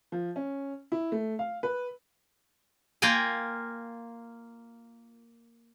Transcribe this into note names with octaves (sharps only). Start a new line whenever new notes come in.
F3
C#4
E4
A3
F5
B4
A#3 F4 A#4 G5 G#5